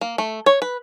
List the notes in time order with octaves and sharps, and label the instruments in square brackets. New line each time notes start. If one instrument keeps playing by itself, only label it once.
[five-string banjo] A#3
A3
C#5
B4